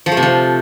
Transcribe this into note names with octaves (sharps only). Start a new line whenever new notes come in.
F3
A3
C3
F3